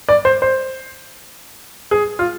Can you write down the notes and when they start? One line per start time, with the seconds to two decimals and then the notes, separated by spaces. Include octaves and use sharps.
0.09 D5
0.25 C5
0.42 C5
1.91 G#4
2.19 F4